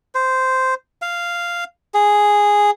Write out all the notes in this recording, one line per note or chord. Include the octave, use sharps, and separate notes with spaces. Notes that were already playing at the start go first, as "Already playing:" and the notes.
C5
F5
G#4